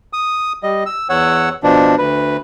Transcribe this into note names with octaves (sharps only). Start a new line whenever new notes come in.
D#6
G3 D#5
E6
E2 C#5 F#5 E6
B2 F3 D4
D2 B4